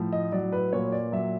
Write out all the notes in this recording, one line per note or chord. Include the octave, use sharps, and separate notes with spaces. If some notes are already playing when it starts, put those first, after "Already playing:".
Already playing: A2 F3
D#5
F#3 D5
B4
A#2 C#5
D5
F#3 E5